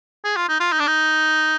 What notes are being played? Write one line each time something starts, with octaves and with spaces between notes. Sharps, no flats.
G#4
F4
D#4
F4
D#4
D4
D#4